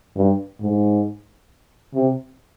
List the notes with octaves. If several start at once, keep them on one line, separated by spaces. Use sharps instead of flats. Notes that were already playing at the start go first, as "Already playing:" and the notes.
G2
G#2
C3